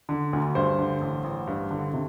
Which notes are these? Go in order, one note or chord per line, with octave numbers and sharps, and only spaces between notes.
D3
D2
G2 C5
D3
A1
A1
G2
D3
C3